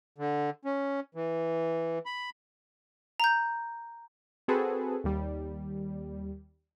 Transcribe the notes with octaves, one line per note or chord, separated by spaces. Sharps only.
D3
C#4
E3
B5
A#5 G6
C4 F#4 G#4 A4 B4
D#2 G3